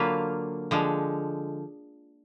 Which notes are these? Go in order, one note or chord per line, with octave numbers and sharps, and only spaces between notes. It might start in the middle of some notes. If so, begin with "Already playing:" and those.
Already playing: D3 F#3 A#3 F4 B4
D3 F3 G#3